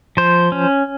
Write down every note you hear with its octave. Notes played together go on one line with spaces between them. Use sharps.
F3 C5
C#4